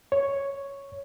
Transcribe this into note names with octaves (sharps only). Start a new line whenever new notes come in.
C#5